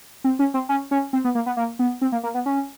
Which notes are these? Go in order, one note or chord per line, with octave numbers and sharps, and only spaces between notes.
C4
C#4
C4
C#4
C#4
C4
B3
A#3
B3
A#3
B3
C4
A#3
A#3
B3
C#4